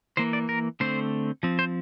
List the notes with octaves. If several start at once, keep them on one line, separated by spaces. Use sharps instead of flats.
E3 A#3 C5
D5
A#4
D3 A3 C4 C5
F3 C4
C5